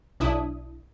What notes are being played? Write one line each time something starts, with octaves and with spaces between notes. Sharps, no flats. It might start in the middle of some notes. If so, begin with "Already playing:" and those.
B1 D4 E4 D#6